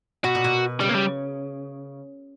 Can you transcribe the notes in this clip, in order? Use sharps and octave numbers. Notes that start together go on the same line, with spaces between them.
B2 F#4
A#2
B2
C#3 G3
A#3
G3